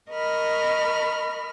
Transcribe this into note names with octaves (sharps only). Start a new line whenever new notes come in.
A#4 D#5 B5 C#6 F6